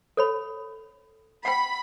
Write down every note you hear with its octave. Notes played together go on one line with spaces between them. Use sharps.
A4 C#5 B5
F#5 G5 B5